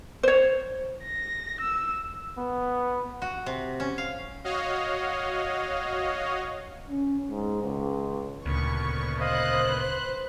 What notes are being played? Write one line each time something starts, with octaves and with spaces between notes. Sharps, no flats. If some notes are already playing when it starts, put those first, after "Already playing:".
C5 C#5
A#6
E6
B3
F#4
C3
C#4
F5
F#4 C#5 D#5 F5
C#4
G#2
C#2
D2 A#2 C#3 B3 C#6
C5 D#5 F5 D#6 F#6
B4